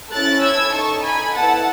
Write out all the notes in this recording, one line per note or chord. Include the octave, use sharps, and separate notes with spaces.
C#4 E4 A4 F#6 A6
E6 G#6
D#4 A4 A5 C#6
G#5 B5
B3 E4 A4 F#5 A5